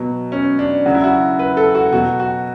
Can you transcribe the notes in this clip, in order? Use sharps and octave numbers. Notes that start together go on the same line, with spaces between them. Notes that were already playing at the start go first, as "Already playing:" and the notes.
Already playing: B2 F#3
C#4
D4
C#3 F#3 F#4
E4
F#4
B4
A4
F#4
B2 F#3 F#4
F#4